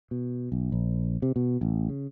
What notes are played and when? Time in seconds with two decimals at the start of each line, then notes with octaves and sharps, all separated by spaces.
0.11 B2
0.52 B1
0.72 A#1
1.22 C3
1.36 B2
1.61 A1
1.89 C#3